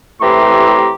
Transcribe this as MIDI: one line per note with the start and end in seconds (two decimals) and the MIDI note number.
0.21 0.92 45
0.21 0.92 48
0.21 0.92 52
0.21 0.92 67
0.21 0.92 82
0.21 0.92 84